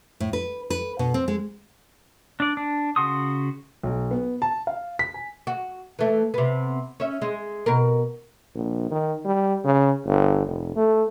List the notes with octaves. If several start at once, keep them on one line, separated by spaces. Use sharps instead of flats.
A2
B4
B4
B2
C4
G#3
D4 D5
D4
C#3 F#4 C6 D#6
B1
B3
A5
F5
B6
G#5
F#4
E3 A3
C3 B3
C#4 E5
G#3
B2 A#4
A#1
D#3
G3
C#3
G1
F1
A3